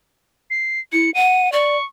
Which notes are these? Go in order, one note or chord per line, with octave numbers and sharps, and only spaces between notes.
C7
E4 C#7
F#5 D#7
D5 C#6